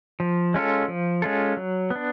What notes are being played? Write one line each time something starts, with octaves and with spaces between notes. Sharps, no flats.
F3
G#3 C#4 F4 A4
F3
G#3 C#4 F4 A4
F#3
B3
D4